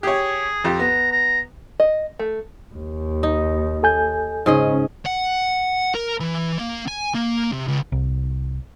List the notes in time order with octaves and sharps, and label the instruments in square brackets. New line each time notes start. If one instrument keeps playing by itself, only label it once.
[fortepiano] G4 C#5 [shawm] G#4
[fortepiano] F2 G4
[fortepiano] B3 [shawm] A#5
[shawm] A#5
[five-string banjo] D#5
A3
[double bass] D#2
[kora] D#4
[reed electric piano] A4 G#5 G6
[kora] G#2 G#4 D#5 [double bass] C#3 C#4
[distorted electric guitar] F#5
A#4
E3
A#3
G#5
A#3
C3
C#2
[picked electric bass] C2